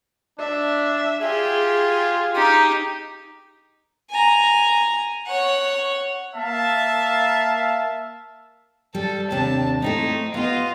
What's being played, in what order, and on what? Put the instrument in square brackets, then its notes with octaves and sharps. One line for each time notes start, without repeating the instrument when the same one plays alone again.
[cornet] D4 [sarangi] E5
[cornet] F4 [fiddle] G4 [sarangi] G#4
[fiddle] D#4 [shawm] G4
[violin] G#5 A#5
C#5 F#5
[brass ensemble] A#3 E5 F5 A5
[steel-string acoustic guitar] G3 [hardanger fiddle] A4
[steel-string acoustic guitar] D#2 C3 D4 [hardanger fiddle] A5
[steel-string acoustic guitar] A3 C4 E4 [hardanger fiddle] D#4
[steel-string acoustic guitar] B3 G4 [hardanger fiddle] F4 D#5